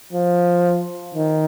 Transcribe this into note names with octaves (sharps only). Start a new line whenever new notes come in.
F3
D#3